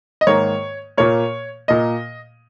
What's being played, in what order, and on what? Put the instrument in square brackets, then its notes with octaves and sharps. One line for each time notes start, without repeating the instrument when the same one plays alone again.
[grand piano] D#5
G#2 D#3 A#3 C#5
A#2 A#3 C#5
A#2 A#3 D#5